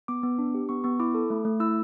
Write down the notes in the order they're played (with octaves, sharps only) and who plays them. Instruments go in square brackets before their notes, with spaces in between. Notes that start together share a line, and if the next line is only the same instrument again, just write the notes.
[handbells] B3 D6
B3
D4
G4
B3 C#6
B3 C#6
E4 D6
A4
A3
A3
E4 E6